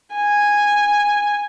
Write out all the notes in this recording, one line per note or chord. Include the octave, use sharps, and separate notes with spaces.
G#5